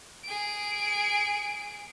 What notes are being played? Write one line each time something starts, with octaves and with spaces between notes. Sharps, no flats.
G#4 D7